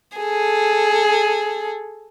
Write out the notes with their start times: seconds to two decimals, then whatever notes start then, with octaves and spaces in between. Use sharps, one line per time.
0.18 G#4 A4